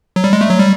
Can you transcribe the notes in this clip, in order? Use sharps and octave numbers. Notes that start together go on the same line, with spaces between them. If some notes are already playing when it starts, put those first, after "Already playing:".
F#3
G3
G#3
A3
F#3
G3